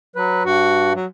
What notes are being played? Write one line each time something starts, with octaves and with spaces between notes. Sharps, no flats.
F#3 B4
G2 F#4
F#3